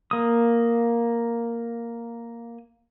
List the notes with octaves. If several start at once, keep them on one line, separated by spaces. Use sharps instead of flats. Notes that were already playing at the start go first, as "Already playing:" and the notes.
A#3 D#6